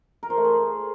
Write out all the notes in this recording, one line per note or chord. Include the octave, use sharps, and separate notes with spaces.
A#4
C5
A3
G#4